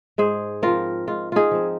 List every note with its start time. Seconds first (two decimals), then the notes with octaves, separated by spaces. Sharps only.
0.18 G#2 G#4 C5
0.62 F3 C4 F4 A#4
1.07 G#2 F4
1.32 D#4 F4 G#4
1.51 F3 C4